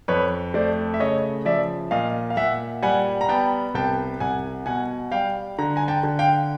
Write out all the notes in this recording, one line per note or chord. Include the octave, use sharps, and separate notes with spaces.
F2 B4 C#5
A3 C5 D5
E5
C#3 C#5 D#5
F3 D5 E5
A#2 D#5 F5
F5
A#2 E5 F#5
G3 F#5 G#5
A#5
B3 G5 A5
C2 G5 A5
C2 F#5 G#5
B2 F#5 G#5
G3 F5 G5
D3 A#5
G#5 A#5
G5 A5
D3
F5 G5